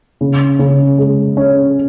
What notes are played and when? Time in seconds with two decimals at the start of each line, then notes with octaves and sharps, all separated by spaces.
0.21 C#3
0.59 C#3
0.98 G#3
1.37 C#4